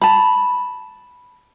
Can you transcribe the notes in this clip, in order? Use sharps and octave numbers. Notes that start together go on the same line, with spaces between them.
A5 B5